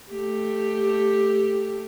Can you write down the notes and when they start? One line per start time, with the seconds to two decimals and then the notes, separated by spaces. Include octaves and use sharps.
0.11 A3 G4